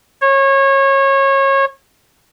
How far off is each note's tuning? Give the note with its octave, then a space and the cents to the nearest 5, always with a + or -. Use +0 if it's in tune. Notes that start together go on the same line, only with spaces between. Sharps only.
C#5 -25